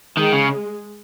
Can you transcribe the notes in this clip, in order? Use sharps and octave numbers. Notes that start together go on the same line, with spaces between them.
D#3 G#3
C#3